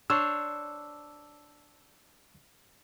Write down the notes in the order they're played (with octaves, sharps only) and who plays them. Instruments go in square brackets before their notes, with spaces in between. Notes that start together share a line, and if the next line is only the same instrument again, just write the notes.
[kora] D4 C5 C#5 [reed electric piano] E6